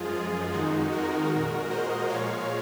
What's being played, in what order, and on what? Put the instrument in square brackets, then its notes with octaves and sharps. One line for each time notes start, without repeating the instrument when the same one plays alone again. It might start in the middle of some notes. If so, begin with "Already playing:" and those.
Already playing: [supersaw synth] F#2 F3 G#3 F4 G#4
F4 G#4
F2 D#3 G#3 D#4 F#4
F#4 A#4
A#2 G#3
C5 D#5
A#2 F3 G#3 C#5 F5